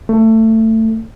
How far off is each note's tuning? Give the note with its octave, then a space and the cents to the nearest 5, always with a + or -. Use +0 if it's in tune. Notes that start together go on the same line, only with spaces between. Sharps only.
A3 +20